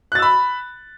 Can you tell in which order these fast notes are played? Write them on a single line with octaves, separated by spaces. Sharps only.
F#6 A6 E6 B5